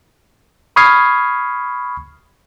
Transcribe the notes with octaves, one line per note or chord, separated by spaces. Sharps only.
B5 C#6 D#6 F6 G#6 C7